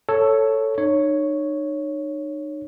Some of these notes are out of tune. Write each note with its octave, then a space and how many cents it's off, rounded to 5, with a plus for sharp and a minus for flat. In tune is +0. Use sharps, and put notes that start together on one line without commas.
A4 +5 C#5 +0
D#4 -40 C#5 +0